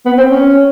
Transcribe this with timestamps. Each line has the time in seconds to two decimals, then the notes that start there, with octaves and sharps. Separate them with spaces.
0.06 B3
0.18 C4
0.29 C#4